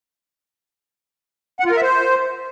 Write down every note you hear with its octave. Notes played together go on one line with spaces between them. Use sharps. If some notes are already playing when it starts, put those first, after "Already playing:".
F#5
F4
A#4
E5
C5